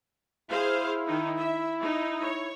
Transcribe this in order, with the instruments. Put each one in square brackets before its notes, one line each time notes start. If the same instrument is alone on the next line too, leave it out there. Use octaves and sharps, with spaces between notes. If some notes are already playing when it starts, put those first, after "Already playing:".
[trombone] E4 [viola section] G#4 C5 F5
[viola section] D#3 D#4
E5
D#4
C#5